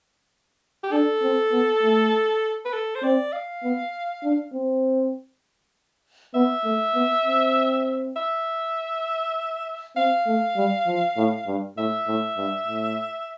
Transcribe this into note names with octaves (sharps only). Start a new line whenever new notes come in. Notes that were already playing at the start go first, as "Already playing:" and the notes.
G4
D4 A4
C4
B3
A3
B4
A4
C5
C4 D5
F5
B3
D4
C4
B3 E5
A3
B3
C4
E5
C4 F5
A3
G3
F3
A2
G2
A2 E5
A2
G2
A2